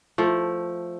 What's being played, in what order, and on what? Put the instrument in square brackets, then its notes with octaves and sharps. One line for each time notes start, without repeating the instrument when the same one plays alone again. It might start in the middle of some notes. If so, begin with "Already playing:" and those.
[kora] F3 A3